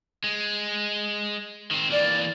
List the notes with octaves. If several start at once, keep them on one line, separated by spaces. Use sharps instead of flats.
G#3
D#3 C4
E3 A#3 D5